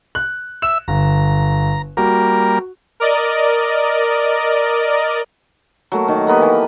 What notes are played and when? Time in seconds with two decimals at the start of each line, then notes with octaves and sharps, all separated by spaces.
0.15 F#6
0.62 E5 E6 E7
0.88 G1 A#5
1.97 G3 A#3 F#4 A#4
3.00 A#4 D5 D#5
5.92 F#3 A3 A#3 A#4
6.08 D#3
6.27 F#3 A#3 B3 G4
6.42 E3 G5